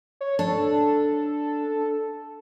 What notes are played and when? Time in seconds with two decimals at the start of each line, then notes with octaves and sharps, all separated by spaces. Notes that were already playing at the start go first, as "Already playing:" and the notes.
0.21 C#5
0.39 D4 A4